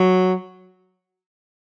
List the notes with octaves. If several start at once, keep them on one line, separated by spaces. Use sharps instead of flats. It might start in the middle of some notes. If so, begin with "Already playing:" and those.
Already playing: F#3